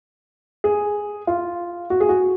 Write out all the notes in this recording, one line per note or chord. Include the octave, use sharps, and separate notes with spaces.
G#4
F4
F#4
G#4
F#4